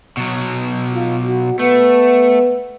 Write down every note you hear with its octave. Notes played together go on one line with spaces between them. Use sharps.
B2 F#3
F4
F#4
A3 B3